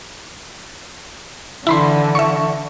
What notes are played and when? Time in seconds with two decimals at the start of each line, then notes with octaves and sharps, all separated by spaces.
1.67 D3 E3 E4 B5 C6
2.15 E5 C#6